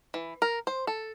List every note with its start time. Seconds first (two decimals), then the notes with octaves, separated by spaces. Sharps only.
0.14 E3
0.42 A#4
0.67 C5
0.87 A4